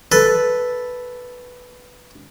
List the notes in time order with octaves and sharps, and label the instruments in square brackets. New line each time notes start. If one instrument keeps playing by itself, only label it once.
[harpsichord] A4 B4